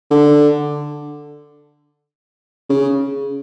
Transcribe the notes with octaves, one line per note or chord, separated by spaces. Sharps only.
D3
C#3